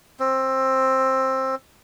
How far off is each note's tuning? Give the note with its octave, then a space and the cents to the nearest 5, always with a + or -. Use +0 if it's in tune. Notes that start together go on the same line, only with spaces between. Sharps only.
C4 +15